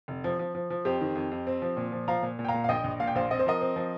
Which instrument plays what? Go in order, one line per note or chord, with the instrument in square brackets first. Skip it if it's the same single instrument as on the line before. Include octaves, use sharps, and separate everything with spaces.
[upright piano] F1
F3
F3
F3
F3
F2 G4 C5
D#3
F2
F2
C4
F3
A#2
F3
F3 F5 A#5
A#2
A#2
G5
F5 A#5
A#2
F5
A#1 D#5 G5
A#1
A#2 F5
G5
A#1 C5 F5
C4 D#5
C5
F3 A#4 D#5
C4
F3